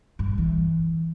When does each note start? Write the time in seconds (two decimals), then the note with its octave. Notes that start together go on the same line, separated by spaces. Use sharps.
0.19 G2
0.38 E3